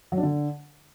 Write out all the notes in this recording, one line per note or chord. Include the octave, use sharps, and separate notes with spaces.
F#3
D4
D3